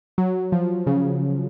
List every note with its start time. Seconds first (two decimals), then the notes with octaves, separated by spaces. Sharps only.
0.18 F#3
0.52 F3
0.87 C#3